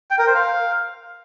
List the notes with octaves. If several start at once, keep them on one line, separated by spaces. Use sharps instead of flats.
G5
A#4
C5
F5